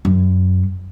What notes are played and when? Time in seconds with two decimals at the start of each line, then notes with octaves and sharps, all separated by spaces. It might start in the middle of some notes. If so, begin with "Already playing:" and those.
0.05 F#2